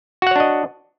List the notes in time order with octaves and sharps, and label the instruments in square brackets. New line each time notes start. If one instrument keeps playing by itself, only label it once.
[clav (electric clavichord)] F#4
F#5
C#5
D4
D#5